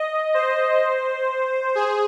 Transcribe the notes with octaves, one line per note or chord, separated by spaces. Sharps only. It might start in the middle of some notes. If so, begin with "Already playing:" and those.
Already playing: D#5
C5
G#4